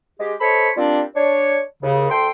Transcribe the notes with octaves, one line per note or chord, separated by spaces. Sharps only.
G#3 G4
A4 C5 C#5 D#5 B5
G3 A#3 C4 D4 F4
D4 C#5
D#2 C#3
D2 A4 G5 C6